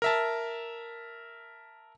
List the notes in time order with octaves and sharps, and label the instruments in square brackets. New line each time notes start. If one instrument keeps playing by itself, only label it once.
[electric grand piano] A#4 E5 A5